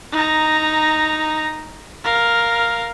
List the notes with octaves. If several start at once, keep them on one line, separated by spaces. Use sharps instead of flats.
D#4 A#5
A#4 F5